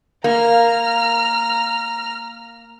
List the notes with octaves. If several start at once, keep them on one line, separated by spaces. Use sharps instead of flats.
A#3 A#5 F6